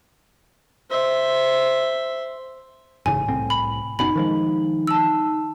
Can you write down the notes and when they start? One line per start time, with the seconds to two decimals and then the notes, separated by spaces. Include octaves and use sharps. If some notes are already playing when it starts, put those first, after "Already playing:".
0.90 C5 E5
3.06 A1 G#2 C#3 G#5
3.28 C2 A2 C4
3.50 B5
3.99 F#1 B2 C#4 D#4 B5
4.16 D#3 F3 G#3
4.87 A5 E6